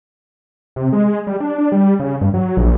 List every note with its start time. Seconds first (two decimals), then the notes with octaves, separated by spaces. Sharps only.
0.76 C3
0.93 G#3
1.27 G3
1.40 D4
1.58 D4
1.72 G3
2.00 C#3
2.21 G2
2.34 F#3
2.57 A#1